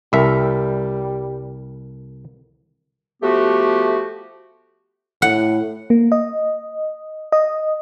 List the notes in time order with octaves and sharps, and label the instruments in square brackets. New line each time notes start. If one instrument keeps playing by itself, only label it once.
[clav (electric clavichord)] C2 E5 [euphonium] G3 [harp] A4 A#4
[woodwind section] F3 A3 B3 F#4 G4
[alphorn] A2 [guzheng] F#5
[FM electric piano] A#3
D#5
D#5